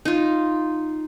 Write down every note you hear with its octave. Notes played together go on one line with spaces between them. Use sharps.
D#4 F4